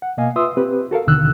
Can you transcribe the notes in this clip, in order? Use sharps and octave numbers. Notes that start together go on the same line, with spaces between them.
F#5
B2 A#3 D#5 F5 G#5
F4 B4 E5 C6 D#6 E6
C4 G4 B4
F#4 A4 A#4 F5
D#2 B2 D3 D#3 E6 F#6